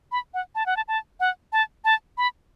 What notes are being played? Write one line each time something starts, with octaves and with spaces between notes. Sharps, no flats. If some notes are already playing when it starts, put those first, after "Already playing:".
B5
F#5
A5
F#5
A5
A5
F#5
A5
A5
B5